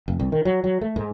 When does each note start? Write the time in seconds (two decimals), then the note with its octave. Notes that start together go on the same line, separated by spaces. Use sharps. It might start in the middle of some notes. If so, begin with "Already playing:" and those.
0.08 F1
0.20 C2
0.32 D#3
0.45 F#3
0.64 F#3
0.81 A3
0.96 G#2